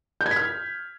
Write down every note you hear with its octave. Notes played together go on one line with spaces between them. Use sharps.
G6
G#6
B6
F6